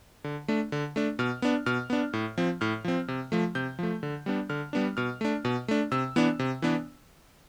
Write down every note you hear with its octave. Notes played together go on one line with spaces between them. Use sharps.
D3
A3 D4
D3
A3 D4
B2 F6
B3 D4
B2 F6
B3 D4
A2
F3 C4
A2 F6
F3 C4
C3
F3 A3
C3 G6
F3 A3
D3
G3 B3 D4
D3 F6
G3 B3 D4
B2 F6
A3 D4
B2
A3 D4
C3 E6
E3 B3 D4
C3
E3 B3 D4